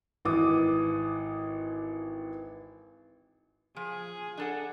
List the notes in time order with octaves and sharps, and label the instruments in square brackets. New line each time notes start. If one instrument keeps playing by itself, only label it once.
[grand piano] G#1 E3 D6 D#6
[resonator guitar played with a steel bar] F3 [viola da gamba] G#4
[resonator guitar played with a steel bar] D4 A4 F#5